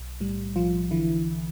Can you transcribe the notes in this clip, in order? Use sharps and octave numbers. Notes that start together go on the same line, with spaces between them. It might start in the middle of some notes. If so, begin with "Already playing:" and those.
Already playing: B1
A2 G3
B1 F3 F4
D3 E3 E4